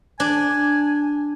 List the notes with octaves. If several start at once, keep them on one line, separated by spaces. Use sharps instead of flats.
D4 G#5